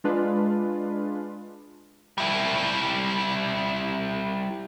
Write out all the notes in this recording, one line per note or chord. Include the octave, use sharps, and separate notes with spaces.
G#3 D4 F4 B4
G3 E4